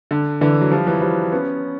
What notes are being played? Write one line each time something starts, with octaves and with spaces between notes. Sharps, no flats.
D3
D3 E3
F#3
F3 G3
E3 F#3
F3 G3
B3 C#4